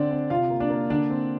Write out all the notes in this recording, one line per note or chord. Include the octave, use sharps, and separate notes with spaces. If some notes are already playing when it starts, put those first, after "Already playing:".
Already playing: D3 C4 D4 D5
C4
C3 F4 F5
A#3
D4 D5
A#3
D3 D4 D5
C4